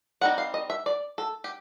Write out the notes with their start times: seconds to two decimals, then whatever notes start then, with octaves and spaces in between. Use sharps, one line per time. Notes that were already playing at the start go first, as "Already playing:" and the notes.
0.21 G3 C4 D#4 F#5
0.38 F5
0.54 D#5
0.70 E5
0.86 D5
1.18 A4
1.44 G4